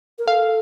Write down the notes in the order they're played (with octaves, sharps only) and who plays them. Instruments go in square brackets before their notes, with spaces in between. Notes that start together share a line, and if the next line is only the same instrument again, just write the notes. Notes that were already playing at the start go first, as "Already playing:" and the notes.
[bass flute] A#4
[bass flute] A4 [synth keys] F5